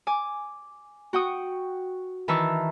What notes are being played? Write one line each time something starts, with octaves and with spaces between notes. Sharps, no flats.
G#5 D6
F#4 G5 C#6 D#6
D#3 E3 E5 A5 C#6 E6